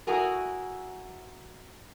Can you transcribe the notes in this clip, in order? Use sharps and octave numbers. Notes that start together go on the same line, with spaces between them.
E4 F#4 G#4 A#4